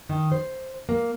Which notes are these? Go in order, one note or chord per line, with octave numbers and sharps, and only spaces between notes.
D#3
C5
A#3